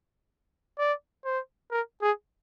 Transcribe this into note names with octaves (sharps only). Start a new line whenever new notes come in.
D5
C5
A#4
G#4